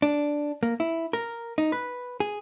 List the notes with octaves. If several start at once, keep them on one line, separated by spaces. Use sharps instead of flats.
D4
A#3
E4
A#4
D#4
B4
G#4